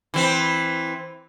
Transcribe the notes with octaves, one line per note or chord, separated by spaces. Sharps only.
E3 C4